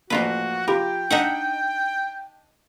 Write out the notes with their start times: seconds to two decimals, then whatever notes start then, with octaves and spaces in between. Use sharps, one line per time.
0.10 A1 F3 A#3 F4 F#4 B4
0.68 F4 G4 A#4 G5 B5
1.10 D4 D#4 D#5 E5 F#5